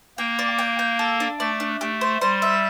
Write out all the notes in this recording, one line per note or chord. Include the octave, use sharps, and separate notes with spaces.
A#3 G5
D5
G5
G5
A4
D4
A3 D5
D4
A3 G4
C5
G3 C5
E5